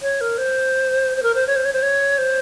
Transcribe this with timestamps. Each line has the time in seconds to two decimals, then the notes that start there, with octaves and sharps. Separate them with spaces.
0.02 C#5
0.21 A#4
0.38 C5
1.17 C5
1.23 A#4
1.35 C5
1.47 C#5
1.56 C5
1.65 C#5
1.73 C5
1.83 C#5
2.18 C5